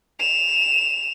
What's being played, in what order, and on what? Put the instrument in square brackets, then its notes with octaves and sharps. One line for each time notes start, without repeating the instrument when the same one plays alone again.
[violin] E7 F7